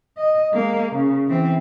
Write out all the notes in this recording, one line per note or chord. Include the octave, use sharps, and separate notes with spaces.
D#5
G#3 A#3
C#3
E3 C4